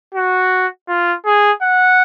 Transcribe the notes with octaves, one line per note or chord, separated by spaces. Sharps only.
F#4
F4
G#4
F#5